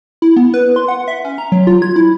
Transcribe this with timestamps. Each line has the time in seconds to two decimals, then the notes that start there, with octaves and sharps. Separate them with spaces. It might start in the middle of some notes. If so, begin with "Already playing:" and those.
0.22 E4
0.36 B3
0.54 B4
0.76 C6
0.88 F#5
1.08 E5
1.25 C#4
1.38 A#5
1.52 F#3
1.67 F4
1.82 G#6
1.96 E4